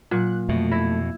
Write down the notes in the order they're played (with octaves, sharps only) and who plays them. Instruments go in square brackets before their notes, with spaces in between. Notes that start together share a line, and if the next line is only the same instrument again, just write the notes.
[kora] A#2 [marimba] F#3 [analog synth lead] F#6
[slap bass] F2 B2 [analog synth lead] A3
[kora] E4 [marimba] A#6